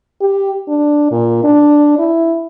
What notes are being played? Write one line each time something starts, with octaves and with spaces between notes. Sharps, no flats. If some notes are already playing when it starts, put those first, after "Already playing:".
G4
D4
A#2
D4
E4